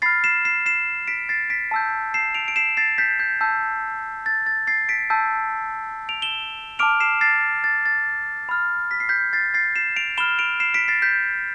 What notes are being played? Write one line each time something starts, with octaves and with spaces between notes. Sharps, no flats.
B5 F6 A6 C7
C7 E7
C7 E7
C7 E7
B6 D7
A6 C7
B6 D7
A5 E6 G6
C7 E7
D7 F7
D7
C7 E7
A6 C7
G6 B6
G6
A5 E6 G6
A6
A6
A6 C7
B6 D7
A5 E6 G6
D7 F7
E7 G7
A5 D6 F6 D7 F7
C7 E7
A6 C7
A6
A6
B5 F6
B6
C7
G6 B6
A6 C7
A6 C7
C7 E7
D7 F7
B5 F6 E7 G7
D7 F7
C7 E7
B6 D7
A6 C7
G6 B6